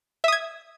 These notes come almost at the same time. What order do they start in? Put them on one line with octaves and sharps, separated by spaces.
E5 D#6 G#6